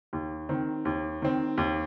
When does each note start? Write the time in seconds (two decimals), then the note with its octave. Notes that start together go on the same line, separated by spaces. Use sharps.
0.13 D#2
0.49 D#3 C4
0.85 D#2
1.22 D#3 C4
1.58 D#2